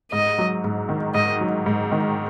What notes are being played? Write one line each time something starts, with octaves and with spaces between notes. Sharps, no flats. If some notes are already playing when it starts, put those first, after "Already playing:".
G#2 D#5
F#3
G#2
D#3
G#2 D#5
F#3
G#2
D#3